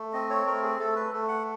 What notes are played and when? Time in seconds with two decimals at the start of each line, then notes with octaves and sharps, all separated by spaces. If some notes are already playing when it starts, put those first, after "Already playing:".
Already playing: A3
0.13 C4 D#5
0.30 C#5
0.46 A3 A#4
0.63 G#4
0.79 A3 A4
0.96 B4
1.12 A3
1.28 F#5